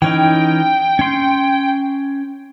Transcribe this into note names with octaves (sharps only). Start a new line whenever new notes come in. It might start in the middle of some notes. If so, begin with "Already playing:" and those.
E3 C#4 D#4 G5
C#4 C6